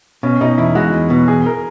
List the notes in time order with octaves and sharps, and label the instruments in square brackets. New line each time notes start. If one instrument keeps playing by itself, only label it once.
[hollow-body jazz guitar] B2 [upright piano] C#4
[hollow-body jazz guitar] B2 [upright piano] D#4
[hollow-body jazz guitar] E2 [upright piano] E4
[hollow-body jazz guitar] G#3 [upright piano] F#4
[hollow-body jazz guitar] E2
B2
[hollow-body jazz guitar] E2 [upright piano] G#4
[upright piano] A#4